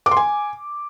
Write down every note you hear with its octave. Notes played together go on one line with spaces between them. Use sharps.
D6
C6
G#5